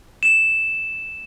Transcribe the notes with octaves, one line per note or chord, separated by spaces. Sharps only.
E7